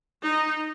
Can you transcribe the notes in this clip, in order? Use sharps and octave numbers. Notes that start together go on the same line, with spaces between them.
D#4